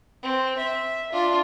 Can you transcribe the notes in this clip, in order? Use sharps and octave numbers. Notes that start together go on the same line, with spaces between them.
C4
E5
D4 F4